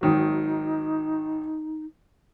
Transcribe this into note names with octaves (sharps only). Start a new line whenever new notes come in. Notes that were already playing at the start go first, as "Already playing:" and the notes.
G#1 D#3 F#3 D#4